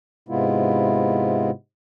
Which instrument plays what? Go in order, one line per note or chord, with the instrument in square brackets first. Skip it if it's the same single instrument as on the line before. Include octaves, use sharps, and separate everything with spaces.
[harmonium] G#2 C3 G#3 B3 E4 F4